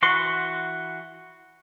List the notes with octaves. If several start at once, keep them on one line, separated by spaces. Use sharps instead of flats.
E3 F#4 B4 C6